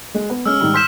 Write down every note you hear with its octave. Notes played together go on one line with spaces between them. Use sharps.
G#3
B3
G#3 C#4 E6 F6
G#2 D#3 G3
C6 E6 F6 G6 B6 E7